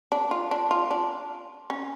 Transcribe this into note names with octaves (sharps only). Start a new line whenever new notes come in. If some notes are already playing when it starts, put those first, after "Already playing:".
D4
F4
D4
F4
D4
C#4